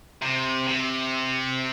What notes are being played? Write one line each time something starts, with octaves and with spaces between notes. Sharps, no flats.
C3
C3